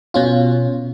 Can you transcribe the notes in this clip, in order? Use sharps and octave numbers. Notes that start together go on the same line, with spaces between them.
B2 C#4 F4